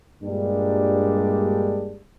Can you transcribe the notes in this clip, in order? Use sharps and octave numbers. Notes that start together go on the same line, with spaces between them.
G2 A#2 G3 G#3 A#3 D4